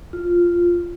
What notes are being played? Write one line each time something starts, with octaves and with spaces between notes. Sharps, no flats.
F4